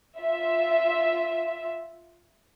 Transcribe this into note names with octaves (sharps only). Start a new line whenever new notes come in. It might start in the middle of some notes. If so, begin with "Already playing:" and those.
F4 E5